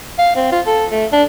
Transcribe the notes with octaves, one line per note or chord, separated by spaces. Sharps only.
F5
C4
F4
A4
A3
D4